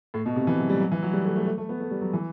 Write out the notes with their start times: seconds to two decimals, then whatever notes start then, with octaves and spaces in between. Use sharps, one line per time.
0.14 A2
0.26 B2
0.36 C3
0.47 E3
0.58 F#3
0.69 G3
0.80 F#3
0.92 E3
1.02 F#3
1.13 G3
1.25 A3
1.36 A3
1.46 A3
1.58 A3
1.69 B3
1.80 A3
1.91 G3
2.01 F#3
2.13 E3